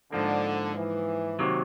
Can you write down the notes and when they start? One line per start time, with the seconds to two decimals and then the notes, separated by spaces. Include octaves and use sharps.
0.12 G#2 D3 F3 A#3
0.76 E3
1.39 C3 D#3 F#3 A#3